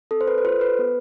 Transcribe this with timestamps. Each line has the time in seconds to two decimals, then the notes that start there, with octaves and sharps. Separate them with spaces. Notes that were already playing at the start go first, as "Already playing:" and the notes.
0.11 C4 A4
0.21 C5
0.28 B4
0.38 B4
0.44 F4 A4 C5
0.61 B4
0.79 B3